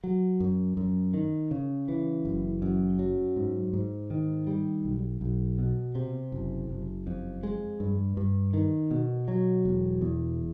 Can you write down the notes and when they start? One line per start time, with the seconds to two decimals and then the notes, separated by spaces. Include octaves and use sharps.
0.04 F#3
0.40 F#2
0.77 F#2
1.14 D#3
1.51 C#3
1.88 E3
2.25 F#1
2.62 F#2
2.99 F#3
3.36 G#2
3.73 G#2
4.10 D#3
4.47 G3
4.85 B1
5.21 B1
5.58 B2
5.95 C3
6.32 F#1
6.69 F#1
7.07 F2
7.43 G#3
7.80 G2
8.17 G2
8.54 D#3
8.91 B2
9.28 F#3
9.65 E1
10.01 E2